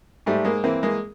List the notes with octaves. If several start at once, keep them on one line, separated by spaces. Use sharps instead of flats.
G#2 G3 A3
G#3 A#3
E3 A#3 C4
G#3 A#3